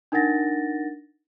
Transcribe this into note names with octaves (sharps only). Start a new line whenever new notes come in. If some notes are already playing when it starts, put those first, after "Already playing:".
D4 D#4 A#4 F#5 A6 A#6